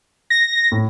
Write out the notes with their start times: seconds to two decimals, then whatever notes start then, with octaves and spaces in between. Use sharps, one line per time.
0.30 A#6
0.72 A2